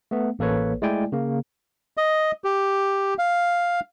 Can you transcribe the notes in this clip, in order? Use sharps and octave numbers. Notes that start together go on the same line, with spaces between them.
A3 B3
A1 A#3 A4 B4 C#5
G#3 A3 E4 D5 G5 G#5
C#3 A#3
D#5
G4
F5